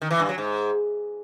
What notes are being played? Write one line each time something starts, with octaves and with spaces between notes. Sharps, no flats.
D#3
E3
G2
F#3
G#2